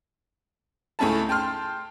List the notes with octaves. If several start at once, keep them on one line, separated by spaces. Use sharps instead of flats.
C#2 A3 C#4 E4 A5
G5 A5 C6 F6